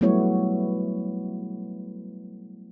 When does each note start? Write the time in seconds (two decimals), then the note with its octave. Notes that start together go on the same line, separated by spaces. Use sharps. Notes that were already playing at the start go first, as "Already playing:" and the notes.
0.01 F#3 G3 A3 B3 E4 C#5